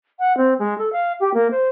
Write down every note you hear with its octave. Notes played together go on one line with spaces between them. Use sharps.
F#5
C4
G#3
A4
F5
G4
A#3
C5